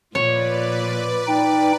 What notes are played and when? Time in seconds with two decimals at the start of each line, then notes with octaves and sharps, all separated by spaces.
0.15 A#2 F3 B4 C#5 D5
1.27 D#4 G5